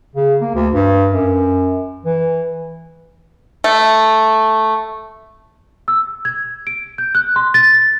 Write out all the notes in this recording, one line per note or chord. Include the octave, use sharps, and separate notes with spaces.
C#3
A#3
D2
G2
F#2
E3
A3
E6
G#6
D7
G6
F#6
C6
A6